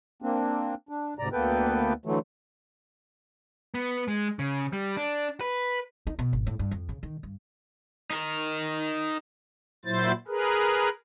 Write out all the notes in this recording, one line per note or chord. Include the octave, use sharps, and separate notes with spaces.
A#3 C4 D4
D4
D2 G#2 C3 D5 A#5
D2 A#3 B3 A4 B4 G5
D3 E3 F#3 A3
B3
G#3
C#3
G3
D4
B4
D#4
B2
G#1
A2
G2
F2
C#3
D#3
G2
D#4 A#4
A#2 F#3 E4 C5 A6
G#4 A#4 B4